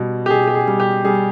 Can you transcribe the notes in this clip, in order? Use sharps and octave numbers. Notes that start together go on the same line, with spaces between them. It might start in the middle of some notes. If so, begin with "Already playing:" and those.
Already playing: B2 G3
G4
B2 G#4
G4
G#4
G3
G4
G3 G#4